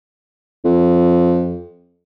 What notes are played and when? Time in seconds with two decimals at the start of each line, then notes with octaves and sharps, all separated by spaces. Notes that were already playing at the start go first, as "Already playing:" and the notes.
0.65 F2